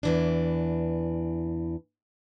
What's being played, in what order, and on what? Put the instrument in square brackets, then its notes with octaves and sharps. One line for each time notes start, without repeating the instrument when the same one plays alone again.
[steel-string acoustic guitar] E2 E3 D4